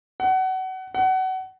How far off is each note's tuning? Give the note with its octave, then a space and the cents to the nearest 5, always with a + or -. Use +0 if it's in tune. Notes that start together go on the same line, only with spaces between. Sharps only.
F#5 +25
F#5 +25